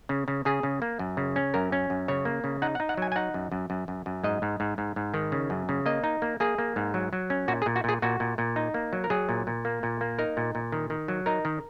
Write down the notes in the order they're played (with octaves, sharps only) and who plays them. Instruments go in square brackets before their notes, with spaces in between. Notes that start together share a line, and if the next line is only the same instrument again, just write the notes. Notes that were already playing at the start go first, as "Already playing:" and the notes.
[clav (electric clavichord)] C#3
C#3
C#3 G#4
C#3
A#3
F#2
C#3
C#4
F#2 A#4
C#4
F#2
C#3 C#5
A#3
C#3
D#4 F#5
F#5
D#4
F#5
F#3 G#5
G#5
D#4 F#5
F#2
F#2
F#2
F#2
F#2
G#2 D#5
G#2
G#2
G#2
G#2
D#3
C#3
F#2
C#3
A#3 D#5
D#4
A#3
A#3 G#4
A#3
G#2
F#3
F#3
C#4
A#2 F#4
G#4
A#2
F#4
A#2 G#4
A#2 F#4
A#2
A#2
D#4
A#3
F#3
A#4
F#3 G#4
A#2
A#2
A#3
A#2
A#3
D#4 A#4
A#2
A#2
D#3
D#3
F#3
D#4 A#4
D#3